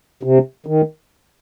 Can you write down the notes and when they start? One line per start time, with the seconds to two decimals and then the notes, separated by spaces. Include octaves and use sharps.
0.23 C3
0.66 D#3